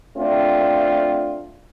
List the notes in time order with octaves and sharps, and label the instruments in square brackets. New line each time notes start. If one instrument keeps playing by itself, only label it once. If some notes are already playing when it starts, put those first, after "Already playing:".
[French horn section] A3 C4 D4 F4